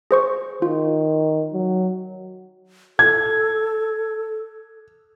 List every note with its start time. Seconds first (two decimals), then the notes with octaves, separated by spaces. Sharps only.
0.11 G#4 C5 C#6
0.62 D#3 F4
1.53 F#3
2.99 A4 G#6